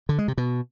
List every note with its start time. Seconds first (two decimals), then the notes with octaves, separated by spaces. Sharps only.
0.09 D3
0.18 G#3
0.28 C3
0.37 B2